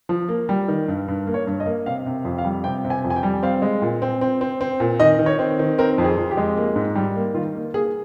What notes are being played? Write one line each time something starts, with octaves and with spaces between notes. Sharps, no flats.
F3
A#3
G3
D#3
G2
G2
A#3
C#5
G2
D#5
A#3
C3 F5
C3
F2
F5
G3
C3 G5
C3
G#5
F2
G#5
G5
G3
C4 F5
G#3
A#2
C4
C4
C4
C4
A#2
D#3 D#5
D#3
C#5
C4
D#3
C4 A#4
F2
G#4
F2
G4
G#3
A#3
G#2
G3
A#3
D#3 F4
A#3
A#3 G#4